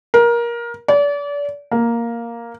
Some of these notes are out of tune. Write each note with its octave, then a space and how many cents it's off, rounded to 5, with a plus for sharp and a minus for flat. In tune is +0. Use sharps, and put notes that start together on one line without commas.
A#4 +20
D5 -35
A#3 +0